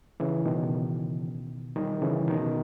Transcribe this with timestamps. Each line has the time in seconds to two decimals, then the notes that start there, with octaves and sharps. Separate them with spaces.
0.20 C#3 E3
0.45 B2 D#3
1.76 D#3 G3
2.02 C#3 E3
2.28 B2 D#3